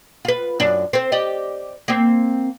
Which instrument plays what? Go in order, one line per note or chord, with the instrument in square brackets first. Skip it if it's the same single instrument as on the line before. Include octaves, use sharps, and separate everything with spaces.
[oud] F4 B4
F#2 D4
C4 C5
G4 D5 D#5
A#3 C4